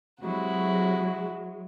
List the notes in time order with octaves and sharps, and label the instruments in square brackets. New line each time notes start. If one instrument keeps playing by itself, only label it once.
[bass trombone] C3 [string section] F#3 G#3 [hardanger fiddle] E4 F#4